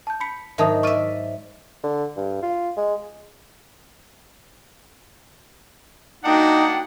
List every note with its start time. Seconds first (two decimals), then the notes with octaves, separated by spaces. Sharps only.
0.07 A5 G6
0.20 B5 B6 C#7
0.58 G#2 D#3 F#3 E5 A5 D#6
0.83 D5 E5 C#6 F6 D#7
1.84 D3
2.17 G2
2.42 F4
2.77 G#3
6.25 A#3 D4 D#4 F#4 F#5 G5